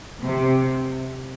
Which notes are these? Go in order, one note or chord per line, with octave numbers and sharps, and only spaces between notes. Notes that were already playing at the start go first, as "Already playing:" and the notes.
C3